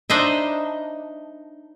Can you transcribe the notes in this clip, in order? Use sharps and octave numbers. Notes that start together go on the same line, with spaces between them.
D4 D#4 C5 D#5 E5 B5